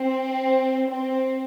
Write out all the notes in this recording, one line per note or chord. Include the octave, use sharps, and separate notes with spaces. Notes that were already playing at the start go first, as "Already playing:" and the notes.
Already playing: C4
C4